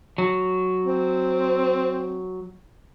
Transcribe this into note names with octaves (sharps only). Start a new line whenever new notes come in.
F#3
C4